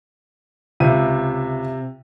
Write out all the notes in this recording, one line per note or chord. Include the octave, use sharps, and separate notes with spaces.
C#2 C3 E5 D#7